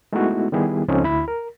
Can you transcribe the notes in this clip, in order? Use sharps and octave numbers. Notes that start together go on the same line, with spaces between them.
G#3 A3 B3 D#4 E4 F#4
D#3 G3 B3 E4 G4 G#4
C#2 F3 C4 C#4 D#4 A4
D2 E4 B5
A#4